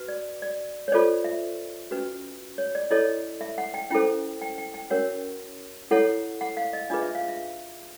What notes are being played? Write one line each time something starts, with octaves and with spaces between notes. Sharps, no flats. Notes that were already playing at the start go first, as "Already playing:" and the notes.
Already playing: F#4 B4
D5
D5
C#5
F4 A4 C5 D5
E5
C#4 F#4 B4
C#5
D5
E4 A4 C#5 D#5
E5
F#5
G5
C#4 E4 A4 C5 G5
G5
G5
G5
C#4 F#4 A#4 C#5 F#5
E4 A4 C#5 F#5
F#5
F5
D#5
D4 F4 G#4 B4 D#5
E5
F5
E5